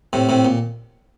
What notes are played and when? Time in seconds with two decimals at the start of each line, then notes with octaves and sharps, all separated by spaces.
0.13 A2 C3
0.29 A2 C3
0.45 A#2